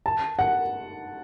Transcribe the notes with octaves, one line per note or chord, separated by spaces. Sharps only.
A5
F#5